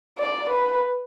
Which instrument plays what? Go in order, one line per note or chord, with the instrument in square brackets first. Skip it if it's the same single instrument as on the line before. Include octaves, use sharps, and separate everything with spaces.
[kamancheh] D5
B4